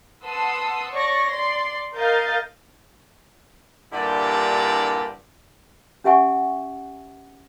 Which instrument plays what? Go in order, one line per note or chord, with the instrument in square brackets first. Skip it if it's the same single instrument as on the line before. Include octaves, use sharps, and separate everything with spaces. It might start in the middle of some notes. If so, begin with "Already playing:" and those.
[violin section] B4 F#5 A5 C6 D#6 E6
C#5 D5 C#6 A#6
D5 C6
A#4 D#5 F5 G6 A6
[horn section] G2 A#2 D3 E4 G4 D5
[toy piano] C#4 G4 E5 F#5 G#5 C#6